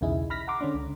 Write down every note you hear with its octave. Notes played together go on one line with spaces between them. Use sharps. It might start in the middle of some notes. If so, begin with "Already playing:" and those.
B1 E2 C#3 D#4 E4 G#4
B5 F6 A#6 B6
F#5 A#5 C6 D6
D3 C#4 D4
C#2 D3